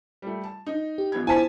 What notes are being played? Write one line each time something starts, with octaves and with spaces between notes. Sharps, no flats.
G3 A3
A5
D#4
G4
A#1 B3 G#6
E4 C5 G#5 A5 B6